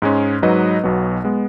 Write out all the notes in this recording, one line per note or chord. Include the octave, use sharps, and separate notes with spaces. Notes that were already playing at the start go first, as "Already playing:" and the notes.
G#2 G#3 C#4
G#2 F#3 D#4 B4 D#5
B1 B2 F#3 B3
G#3 B3